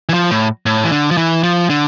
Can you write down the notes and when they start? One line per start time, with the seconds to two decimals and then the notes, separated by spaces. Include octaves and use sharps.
0.09 E3
0.14 F3
0.31 A2
0.66 A2
0.84 E3
0.92 D3
1.11 F3
1.17 E3
1.43 F3
1.70 D3